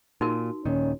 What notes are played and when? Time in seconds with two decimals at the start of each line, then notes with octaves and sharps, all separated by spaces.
0.21 A#2 D#4 F#4 A#4
0.66 D#1 A#2 D#3 C#4